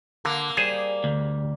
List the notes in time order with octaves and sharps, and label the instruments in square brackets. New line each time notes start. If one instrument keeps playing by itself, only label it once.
[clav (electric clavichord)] D3 [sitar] A#3
[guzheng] G3 [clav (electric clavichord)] G#4 C5
[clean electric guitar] D2